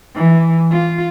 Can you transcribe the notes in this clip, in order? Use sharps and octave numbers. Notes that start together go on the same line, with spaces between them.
E3
F4